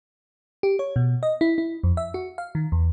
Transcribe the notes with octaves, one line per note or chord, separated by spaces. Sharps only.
G4
C#5
B2
D#5
E4
E4
F2
E5
F#4
F5
D#3
E2